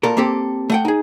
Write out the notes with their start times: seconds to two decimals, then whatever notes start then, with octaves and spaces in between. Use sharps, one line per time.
0.03 A#2 A4 A#4
0.17 A#3 C4 G4 A4
0.70 A3 F#5 G5
0.85 D#4 G#4